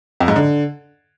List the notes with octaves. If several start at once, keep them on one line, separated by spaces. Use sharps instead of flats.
F2
G#2
D3